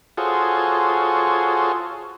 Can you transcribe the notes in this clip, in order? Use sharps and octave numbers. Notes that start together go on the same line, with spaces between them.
F4 F#4 G#4 A4 C5 C#5